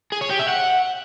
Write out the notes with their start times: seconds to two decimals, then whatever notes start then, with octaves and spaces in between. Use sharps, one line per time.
0.12 G#4
0.21 C#5
0.30 G4
0.39 E5
0.48 F#5